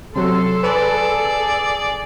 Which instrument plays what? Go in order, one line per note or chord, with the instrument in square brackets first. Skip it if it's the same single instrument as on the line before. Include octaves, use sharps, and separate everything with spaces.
[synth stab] C3 F#3 [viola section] A4 [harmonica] C6
[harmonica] G#4 D5 [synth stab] B4